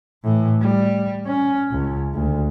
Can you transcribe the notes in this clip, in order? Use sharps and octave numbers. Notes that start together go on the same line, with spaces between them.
A2 E3
G3
C#4
C#2
D2